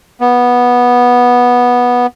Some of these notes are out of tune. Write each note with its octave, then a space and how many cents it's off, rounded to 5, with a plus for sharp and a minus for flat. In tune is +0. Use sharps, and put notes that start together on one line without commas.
B3 -10